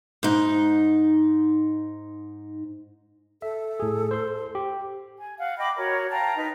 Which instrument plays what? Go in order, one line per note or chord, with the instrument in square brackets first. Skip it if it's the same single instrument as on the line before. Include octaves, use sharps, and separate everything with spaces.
[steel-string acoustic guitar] G#2 D#4
[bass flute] A4 [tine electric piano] E5
[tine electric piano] A2 G#4
C5 C6
G4
[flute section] G#5
F5 F#5
D#5 G5 B5 D6
F#4 A#4 C#5
F5 G5 A5 A#5
D#4 B4 D#5